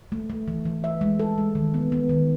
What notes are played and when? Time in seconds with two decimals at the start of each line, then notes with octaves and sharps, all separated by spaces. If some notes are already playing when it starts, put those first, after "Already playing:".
0.12 A3
0.30 A3
0.48 E3
0.66 E3
0.84 E5
1.01 G#3
1.20 A4
1.38 G#3
1.55 D#3
1.74 B3
1.92 B3
2.09 D#3